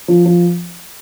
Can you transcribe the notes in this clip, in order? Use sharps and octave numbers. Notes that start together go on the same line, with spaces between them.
F3
F3